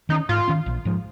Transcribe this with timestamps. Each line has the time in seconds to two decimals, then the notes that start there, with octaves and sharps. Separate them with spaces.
0.09 D#3 C#4 D#4
0.29 G#2 F4
0.48 D#3 C#4
0.66 A#1
0.85 G#2 F3